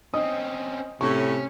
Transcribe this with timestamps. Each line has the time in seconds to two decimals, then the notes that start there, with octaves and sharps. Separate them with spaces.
0.14 C4 C#4 D#5 D#6
1.01 A2 C3 C#4 C#6